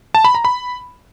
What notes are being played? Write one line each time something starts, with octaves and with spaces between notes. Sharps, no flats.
A5
B5
A#5
B5